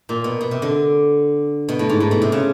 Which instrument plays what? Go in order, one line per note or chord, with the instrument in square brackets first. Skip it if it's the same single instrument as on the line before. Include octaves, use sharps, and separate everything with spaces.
[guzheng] A#2
B2
B2
C3
D3
B2
A2
G#2
A2
B2
C3
C#3